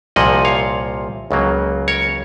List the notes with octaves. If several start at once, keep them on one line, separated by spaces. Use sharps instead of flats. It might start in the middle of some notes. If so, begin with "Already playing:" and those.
C2 A#2 F3 A#3 D#5 F#5
C#5 F5
C#2 C#3 F#3 A#3
A#4 C#5